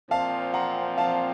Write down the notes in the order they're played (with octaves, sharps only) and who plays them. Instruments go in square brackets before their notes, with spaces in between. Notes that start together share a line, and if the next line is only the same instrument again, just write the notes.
[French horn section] A#2 F3 C4 [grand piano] F5 A5
[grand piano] F#5 A#5
F5 A5